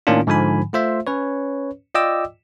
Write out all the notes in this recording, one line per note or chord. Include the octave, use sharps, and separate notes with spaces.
A2 D#3 A#3 C#4 D4 F4
G#2 D3 F3 G#5 B5
A3 F4 C5 E5
C#4 B4 C#5
F4 D5 D#5 G5 D6 E6